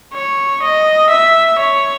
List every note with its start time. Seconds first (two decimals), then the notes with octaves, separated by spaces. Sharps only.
0.14 C#5
0.62 D#5
1.10 E5
1.59 C#5